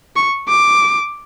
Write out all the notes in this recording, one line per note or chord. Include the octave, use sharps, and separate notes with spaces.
C#6
D6